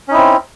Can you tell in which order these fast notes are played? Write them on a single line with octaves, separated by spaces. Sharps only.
C#4 D#4 E4 C4